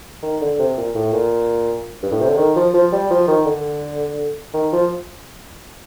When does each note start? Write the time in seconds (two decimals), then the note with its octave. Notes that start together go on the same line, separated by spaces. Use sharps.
0.23 D#3
0.41 D3
0.59 C3
0.77 A#2
0.95 A2
1.13 A#2
2.03 G2
2.11 A2
2.21 C3
2.29 D3
2.38 D#3
2.56 F3
2.74 F3
2.92 G3
3.11 F3
3.28 D#3
3.46 D3
4.54 D#3
4.73 F3